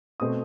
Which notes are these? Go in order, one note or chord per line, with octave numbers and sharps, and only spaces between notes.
B2 A3 C4 D#6